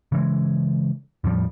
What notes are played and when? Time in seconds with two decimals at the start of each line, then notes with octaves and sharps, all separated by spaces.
0.12 C#3 E3 G#3
1.24 E2 A2 F3 G3